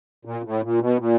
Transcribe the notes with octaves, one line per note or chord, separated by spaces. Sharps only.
A#2
A2
A#2
B2
A#2